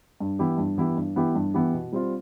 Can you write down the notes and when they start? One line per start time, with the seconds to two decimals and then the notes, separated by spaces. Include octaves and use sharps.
0.20 G2
0.39 E3 B3 E4 G4
0.58 G2
0.78 E3 B3 E4 G4
0.97 G2
1.16 E3 B3 E4 G4
1.35 G2
1.54 E3 B3 E4 G4
1.74 B2
1.93 G3 C4 F4